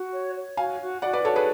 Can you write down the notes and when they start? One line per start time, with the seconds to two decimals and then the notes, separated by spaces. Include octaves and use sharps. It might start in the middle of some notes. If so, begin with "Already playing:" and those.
Already playing: F#4
0.12 C#5
0.36 C#5
0.57 F#4 F5 G#5
0.80 F#4
1.02 F#4 D5 F#5
1.13 B4 D5
1.25 F#4 A4 C#5
1.36 G#4 B4